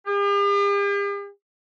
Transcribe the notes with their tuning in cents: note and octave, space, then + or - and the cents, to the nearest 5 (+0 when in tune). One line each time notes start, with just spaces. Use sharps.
G4 +45